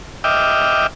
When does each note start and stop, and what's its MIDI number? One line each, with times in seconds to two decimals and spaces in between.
0.24 0.87 75
0.24 0.87 76
0.24 0.87 79
0.24 0.87 86
0.24 0.87 89